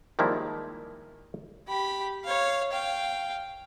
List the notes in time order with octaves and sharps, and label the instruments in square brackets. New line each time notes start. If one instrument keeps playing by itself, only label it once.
[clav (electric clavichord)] D#3 F3 G3 G#3 A#3 E4
[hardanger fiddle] G4 B5
C#5 F5
F5 G5